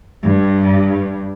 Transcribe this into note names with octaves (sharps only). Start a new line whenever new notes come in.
G2